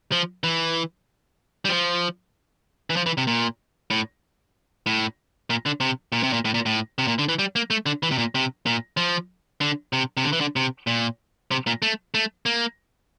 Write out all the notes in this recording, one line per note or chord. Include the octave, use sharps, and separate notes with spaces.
F3
E3
G3
F3
E3
F3
E3
C3
A#2
A2
A2
A#2
D3
C3
A#2
C3
A#2
A2
A#2
A2
C3
A#2
D3
E3
G3
A#3
A3
D3
E3
C3
A#2
C3
A#2
F3
D3
C3
C3
D3
E3
D3
C3
A#2
C3
A#2
A3
A3
A#3